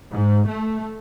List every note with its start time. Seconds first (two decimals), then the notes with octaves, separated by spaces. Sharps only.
0.10 G#2
0.46 A3